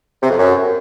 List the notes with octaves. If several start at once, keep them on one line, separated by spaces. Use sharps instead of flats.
C3
F2
F#2